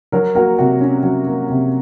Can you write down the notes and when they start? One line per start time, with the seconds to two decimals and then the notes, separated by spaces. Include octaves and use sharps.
0.12 F#3 F#4 A#4
0.35 A#3 F#4 A#4
0.58 C3 F#4
0.81 C#4
1.03 F#3
1.27 A#3
1.50 C3